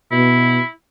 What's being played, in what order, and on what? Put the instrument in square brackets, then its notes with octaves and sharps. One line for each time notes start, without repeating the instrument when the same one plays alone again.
[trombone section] B2 [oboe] E4